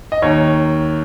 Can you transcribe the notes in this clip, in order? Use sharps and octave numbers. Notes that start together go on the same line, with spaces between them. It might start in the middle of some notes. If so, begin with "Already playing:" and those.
D#5
D#2 D#3 C#5